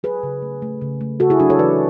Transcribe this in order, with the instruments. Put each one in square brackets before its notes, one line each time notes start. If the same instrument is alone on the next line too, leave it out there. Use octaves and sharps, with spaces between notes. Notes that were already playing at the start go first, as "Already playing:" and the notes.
[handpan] F#3 G#4 B4
C#3
A3
A3
C#3
A3
C#3 F#4 A4
E4 G#4
F#3 D4 F#4
A4 C#5
E3 B4 D5